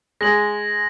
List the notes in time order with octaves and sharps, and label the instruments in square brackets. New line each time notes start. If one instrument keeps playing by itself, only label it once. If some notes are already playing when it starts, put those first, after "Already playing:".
[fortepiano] G#3 [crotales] A#6 F#7